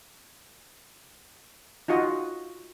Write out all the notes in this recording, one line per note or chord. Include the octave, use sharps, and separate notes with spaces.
D#4 F4 F#4 D#5